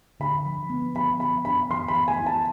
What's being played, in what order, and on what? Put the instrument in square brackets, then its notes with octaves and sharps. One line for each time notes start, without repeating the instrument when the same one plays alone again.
[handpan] D3 [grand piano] B5
[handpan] F3
B3
[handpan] F3 [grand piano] B5
[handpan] B3 [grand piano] B5
[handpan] D4 [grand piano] B5
[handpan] E3 [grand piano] C6
[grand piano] B5
[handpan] B3
[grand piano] G#5
[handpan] E4
[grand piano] A5